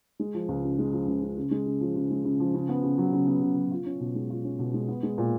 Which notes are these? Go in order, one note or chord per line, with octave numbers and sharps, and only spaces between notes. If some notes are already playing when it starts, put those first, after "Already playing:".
G#3
F3
C#2
C#3
G#3
F3
C#2
C#3
C#3
G#3
C#3
F3
C#3
G#3
C#3
F3
C#3
B3
C#3
F#3
C#3
B3
C#3
F#3
F4
C#4
B2
G#3
F4
C#4
B2
G#3
B3
G#3
A#2